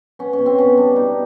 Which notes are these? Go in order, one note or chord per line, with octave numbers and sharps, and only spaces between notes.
B3 C#4
C#4
B2
C4
B3 C#4
G3 D4
B2 D#4